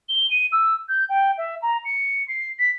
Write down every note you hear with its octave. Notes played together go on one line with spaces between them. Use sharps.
G7
D#7
E6
G6
G5
E5
A#5
C#7
C7
B6